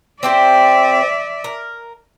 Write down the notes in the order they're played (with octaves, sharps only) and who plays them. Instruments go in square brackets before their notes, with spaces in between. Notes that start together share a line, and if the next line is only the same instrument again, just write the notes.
[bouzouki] C4 G4 C5 [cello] D5 E5
[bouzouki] A#4